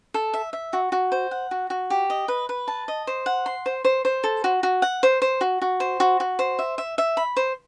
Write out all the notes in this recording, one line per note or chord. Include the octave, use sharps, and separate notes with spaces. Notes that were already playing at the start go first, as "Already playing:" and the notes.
A4
E5
E5
F#4
F#4
C5
F#5
F#4
F#4
G4
D#5
B4
B4
A5
D#5
C5
F#5
C6
C5
C5
C5
A4
F#4
F#4
F#5
C5
C5
F#4
F#4
C5
F#4
F#4
C5
E5
E5
E5
B5
C5